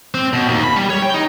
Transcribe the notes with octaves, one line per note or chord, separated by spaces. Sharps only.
C4
B2
D#2
B5
G3
C#5
G5
D#4